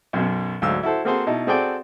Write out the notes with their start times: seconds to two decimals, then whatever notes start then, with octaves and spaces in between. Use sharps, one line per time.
0.13 B1 F#2 B2
0.62 D2 G#2 F#3 F5 E6
0.83 E4 F#4 A4 C5
1.05 A#3 C4 F#4 G#4 A4 C5
1.27 B2 D#4 E4 A5
1.47 C4 F#4 G#4 A4 D5 G5